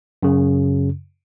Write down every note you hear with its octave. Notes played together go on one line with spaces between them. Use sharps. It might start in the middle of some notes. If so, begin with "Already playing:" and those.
F#2 C#3